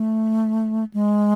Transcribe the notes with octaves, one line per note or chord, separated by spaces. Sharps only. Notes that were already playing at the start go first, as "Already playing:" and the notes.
Already playing: A3
G#3